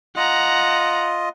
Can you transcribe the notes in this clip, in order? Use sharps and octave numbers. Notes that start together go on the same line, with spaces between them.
F4 D#5 F#5 A#5